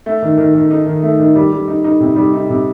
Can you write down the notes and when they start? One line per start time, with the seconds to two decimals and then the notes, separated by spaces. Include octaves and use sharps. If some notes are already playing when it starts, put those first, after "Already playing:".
0.06 A3
0.22 D#3
0.37 D#3
0.55 D#3
0.71 D#4
0.86 D#3
1.03 A3
1.20 D#3
1.35 G3
1.52 G3
1.68 D#4
1.84 D#4
2.00 C3
2.16 G3
2.33 D#4
2.50 C3